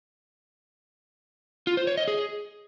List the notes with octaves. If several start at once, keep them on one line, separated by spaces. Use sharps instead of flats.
F4
C5
C#5
D#5
G#4